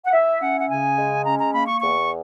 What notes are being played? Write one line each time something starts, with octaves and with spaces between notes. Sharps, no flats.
F#5
E4 E5
C#4 F#5
F#5
C#3 G#5
G#3
C#4 A#5
A#5
A#3 B5
C#6
E2 C#6